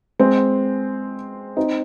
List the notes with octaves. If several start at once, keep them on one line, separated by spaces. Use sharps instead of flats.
G#3 C4
C4 D#4